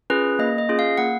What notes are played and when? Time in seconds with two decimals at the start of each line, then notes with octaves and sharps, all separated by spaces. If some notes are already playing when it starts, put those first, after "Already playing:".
0.10 C#4 F4 G#4 B4
0.39 A#3 D#5
0.58 D#5
0.69 C#4 F4 G#4
0.79 F5
0.98 A#3 F#5